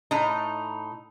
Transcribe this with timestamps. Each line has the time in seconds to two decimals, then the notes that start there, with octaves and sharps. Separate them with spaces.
0.11 A2 D#4